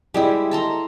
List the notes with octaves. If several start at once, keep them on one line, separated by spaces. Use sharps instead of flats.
G3 G#3 E4 G4
A4 A#5 C6